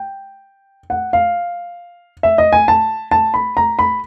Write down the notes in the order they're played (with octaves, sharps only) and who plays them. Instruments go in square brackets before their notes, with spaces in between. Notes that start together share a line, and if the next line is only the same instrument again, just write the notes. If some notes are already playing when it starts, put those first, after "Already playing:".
Already playing: [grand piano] G5
F#5
F5
E5
D#5
G#5
A5
A5
B5
A#5
B5